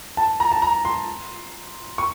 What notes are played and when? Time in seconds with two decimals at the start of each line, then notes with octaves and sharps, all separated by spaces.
0.17 A5
0.40 A#5
0.52 A5
0.62 A#5
0.85 C6
1.98 C#6